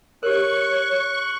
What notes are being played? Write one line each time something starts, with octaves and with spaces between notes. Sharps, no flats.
G4 A#4 C#5 C#6 F#6